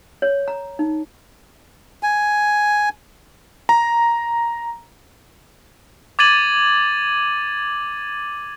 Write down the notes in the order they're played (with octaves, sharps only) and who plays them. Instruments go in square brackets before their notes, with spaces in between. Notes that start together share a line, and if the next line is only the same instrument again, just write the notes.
[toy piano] C#5
A#5
D#4
[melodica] G#5
[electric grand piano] A#5
[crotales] D6 G#6 A6 D#7 F#7